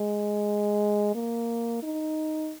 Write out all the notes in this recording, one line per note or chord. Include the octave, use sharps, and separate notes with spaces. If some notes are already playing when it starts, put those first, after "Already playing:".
Already playing: G#3
A#3
D#4